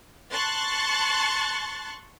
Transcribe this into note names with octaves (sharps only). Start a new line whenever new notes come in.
A5 C6 C#6 F#6 A6